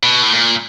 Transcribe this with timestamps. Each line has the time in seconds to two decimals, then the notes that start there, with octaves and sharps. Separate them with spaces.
0.03 B2
0.22 A2
0.32 A#2